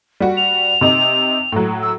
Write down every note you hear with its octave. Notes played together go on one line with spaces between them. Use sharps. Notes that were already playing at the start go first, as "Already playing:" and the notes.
G3 F#4
F7
C3 D#4
A2 F#3
E6